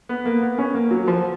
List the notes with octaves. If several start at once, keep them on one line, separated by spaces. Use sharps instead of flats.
B3
A#3
B3
C#4
A#3
F#3
F3